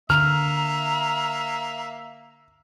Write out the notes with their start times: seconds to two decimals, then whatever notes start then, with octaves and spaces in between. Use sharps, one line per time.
0.10 D3 A#3 E5 A#5 F6